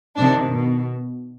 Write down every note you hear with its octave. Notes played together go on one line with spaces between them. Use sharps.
C3 D#3 D4
B2